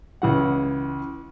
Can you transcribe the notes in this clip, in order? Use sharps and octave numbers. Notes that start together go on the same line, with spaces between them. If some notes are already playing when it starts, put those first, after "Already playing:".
C#2 E3 F#5